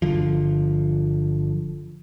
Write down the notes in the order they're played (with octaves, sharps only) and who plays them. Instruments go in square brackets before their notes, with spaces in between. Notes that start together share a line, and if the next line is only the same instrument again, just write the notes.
[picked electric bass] G1 D3 F3